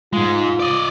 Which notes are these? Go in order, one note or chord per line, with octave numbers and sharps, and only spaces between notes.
G#2 G#3 F4
D5 D#5